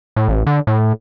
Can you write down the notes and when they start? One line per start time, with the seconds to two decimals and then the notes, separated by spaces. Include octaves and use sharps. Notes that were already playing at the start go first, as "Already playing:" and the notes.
0.16 A2
0.28 A1
0.47 D3
0.67 A2